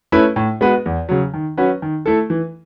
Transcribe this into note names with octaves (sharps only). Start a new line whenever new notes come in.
A3 C#4 E4 B4
A2
G#3 B3 F#4 B4
E2
C#3 F#3
D#3
F#3 C#4 F#4 B4
D#3
A3 E4 A4
E3